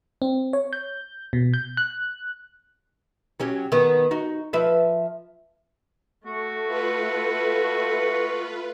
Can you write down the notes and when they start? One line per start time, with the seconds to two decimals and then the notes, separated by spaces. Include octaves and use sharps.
0.22 C4
0.53 C#5
0.73 G6
1.33 B2
1.54 G6
1.77 F#6
3.40 F#3 C#4 G4
3.72 D#3 B3
4.11 D#4 F#4
4.53 F3 B4 E5
6.26 A3 F#4
6.67 F4 B4